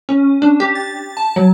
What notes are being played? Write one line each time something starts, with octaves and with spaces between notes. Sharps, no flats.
C#4
D4
G4
A6
A5
F#3